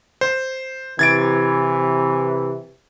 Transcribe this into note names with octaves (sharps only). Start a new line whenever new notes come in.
C5
C3 E3 G#6 A6 D7